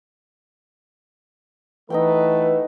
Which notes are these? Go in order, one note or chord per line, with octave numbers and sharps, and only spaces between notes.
E3 A3 D#4 B4 F#5 G5